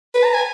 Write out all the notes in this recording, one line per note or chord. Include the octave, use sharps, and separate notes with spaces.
B4
A#5
G#5